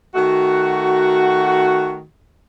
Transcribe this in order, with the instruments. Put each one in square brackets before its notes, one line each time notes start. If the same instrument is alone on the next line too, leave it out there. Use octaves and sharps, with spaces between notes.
[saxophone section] D#3 A3 F#4